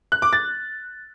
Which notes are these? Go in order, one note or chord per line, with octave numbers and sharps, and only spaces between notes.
F#6
D6
A6